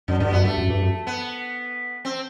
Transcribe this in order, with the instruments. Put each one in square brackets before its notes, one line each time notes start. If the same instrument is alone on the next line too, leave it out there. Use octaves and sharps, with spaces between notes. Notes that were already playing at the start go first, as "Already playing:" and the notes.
[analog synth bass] F#2 [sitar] D3
[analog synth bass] G2 [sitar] D3
[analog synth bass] F#2 [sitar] B3
[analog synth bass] G2 [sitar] A3
[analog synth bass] F#2
G2
F#2
[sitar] B3
C4